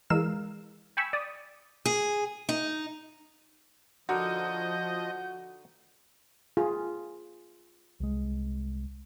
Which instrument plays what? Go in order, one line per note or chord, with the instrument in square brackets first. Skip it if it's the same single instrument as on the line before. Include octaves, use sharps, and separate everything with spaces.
[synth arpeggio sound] E3 G#3 A#4 F5 E6 E7
G5 G#5 B5 C#6 E6
D5 D#6
[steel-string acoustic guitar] G#4
D#4
[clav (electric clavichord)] D3 D#4 A#4 [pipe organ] F3 D#5 [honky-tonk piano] F#4 [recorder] G6
[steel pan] F4 G#4
[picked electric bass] C2 G#3